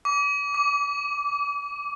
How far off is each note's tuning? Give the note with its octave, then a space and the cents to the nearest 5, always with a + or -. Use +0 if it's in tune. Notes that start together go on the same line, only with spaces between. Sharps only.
D6 -35
D6 -15